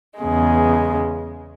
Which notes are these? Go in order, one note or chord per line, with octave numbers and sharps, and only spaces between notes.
E2 C#3 G#3